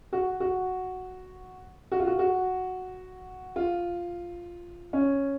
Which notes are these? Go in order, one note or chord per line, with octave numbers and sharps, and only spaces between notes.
F#4
F#4
F#4
F4
F#4
F#4
F4
C#4